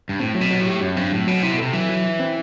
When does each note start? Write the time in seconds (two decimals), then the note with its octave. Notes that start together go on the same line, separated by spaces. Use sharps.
0.09 G2
0.20 A2 C4
0.35 F#3
0.41 B2
0.51 F#3
0.61 A2
0.66 G4
0.81 F#2 F#3
0.96 G2 C4
1.12 A2 F#3
1.27 B2 F#3
1.43 C3 E4
1.52 B2
1.58 C3 A4
1.73 E3 F#3
1.89 F#3
2.05 E4
2.20 C4